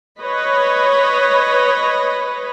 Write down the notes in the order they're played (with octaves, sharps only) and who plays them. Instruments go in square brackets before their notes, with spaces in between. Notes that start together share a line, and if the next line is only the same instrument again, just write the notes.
[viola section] B4 C#5 D#5 B5